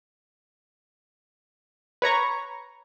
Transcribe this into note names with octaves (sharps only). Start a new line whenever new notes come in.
B4 C#5 A#5 C#6